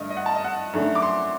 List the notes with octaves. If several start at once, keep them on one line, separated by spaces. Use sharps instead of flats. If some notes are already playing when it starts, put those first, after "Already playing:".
Already playing: G2 D3 A3 D4 D#5
D#5
F#5
A5
D#5
F#5
F#2 D3 A3 D4
D6
C6